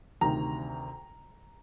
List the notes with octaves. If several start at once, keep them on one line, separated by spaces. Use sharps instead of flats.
D2 C3 D#3 A#5